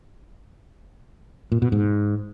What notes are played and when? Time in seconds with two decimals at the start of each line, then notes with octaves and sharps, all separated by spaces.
1.52 A#2
1.62 B2
1.72 G#2